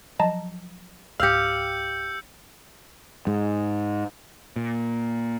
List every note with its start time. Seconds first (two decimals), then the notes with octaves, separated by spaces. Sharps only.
0.20 F3 F#3 D#5 A5 A#5
1.20 C#2 G#2 G4 F5 E6 G6 C#7
3.27 G#2
4.56 A#2